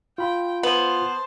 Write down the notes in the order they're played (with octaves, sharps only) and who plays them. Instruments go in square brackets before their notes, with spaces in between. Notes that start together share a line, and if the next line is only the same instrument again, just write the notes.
[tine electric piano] F4 B5 [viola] G5
[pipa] B3 [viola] C5 A5